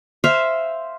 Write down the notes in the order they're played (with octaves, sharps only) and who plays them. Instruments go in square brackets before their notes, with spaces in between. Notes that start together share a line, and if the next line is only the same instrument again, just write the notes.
[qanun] C5 E5 F5